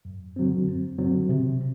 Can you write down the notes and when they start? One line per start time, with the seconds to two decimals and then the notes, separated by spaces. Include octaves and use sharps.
0.05 F#2
0.36 D3 F#3 C4
0.67 F#2
0.98 D3 F#3 C4
1.29 C3